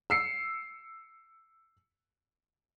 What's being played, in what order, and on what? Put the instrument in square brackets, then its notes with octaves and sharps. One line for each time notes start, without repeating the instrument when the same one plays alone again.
[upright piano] E6 C7 C#7